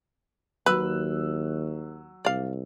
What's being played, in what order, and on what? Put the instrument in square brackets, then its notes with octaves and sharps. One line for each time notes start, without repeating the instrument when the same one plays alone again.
[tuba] D#2 [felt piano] F#3 E6 F#6 [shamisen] B4
[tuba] C2 [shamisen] D5 F5